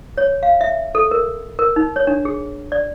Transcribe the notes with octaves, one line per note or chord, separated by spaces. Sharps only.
C#5
F5
E5
A4
A#4
A#4
D#4
C#5
D4
G#4
D5